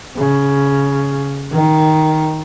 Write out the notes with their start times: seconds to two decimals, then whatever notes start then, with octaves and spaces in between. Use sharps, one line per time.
0.17 C#3
1.52 D#3